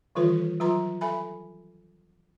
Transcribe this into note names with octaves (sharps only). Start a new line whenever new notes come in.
D#3 E3 G3 F4 A4 B4
F#3 F4 B4 A#5 C6
A4 E5 G#5 B5